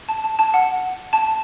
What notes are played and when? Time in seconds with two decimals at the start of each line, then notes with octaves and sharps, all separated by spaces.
0.09 A5
0.24 A5
0.39 A5
0.54 F#5
1.13 A5